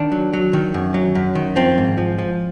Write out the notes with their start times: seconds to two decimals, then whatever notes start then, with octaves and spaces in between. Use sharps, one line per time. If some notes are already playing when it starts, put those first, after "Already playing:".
Already playing: D#3 D4
0.12 F#3
0.33 F#3
0.53 D#3
0.74 F#2
0.94 F#3
1.15 F#2
1.35 D#3
1.56 F3 C4
1.78 G#2
1.98 F3
2.18 F3